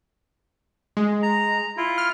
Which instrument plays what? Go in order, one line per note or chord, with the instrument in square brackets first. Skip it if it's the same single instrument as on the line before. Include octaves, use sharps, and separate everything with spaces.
[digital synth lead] G#3
[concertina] A#5
E4 F4
[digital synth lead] F6